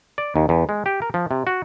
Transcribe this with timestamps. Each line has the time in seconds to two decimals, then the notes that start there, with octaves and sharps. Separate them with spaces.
0.18 D5
0.36 D#2
0.49 E2
0.69 G#3
0.86 G4
1.02 A#4
1.14 F3
1.31 C3
1.47 F#4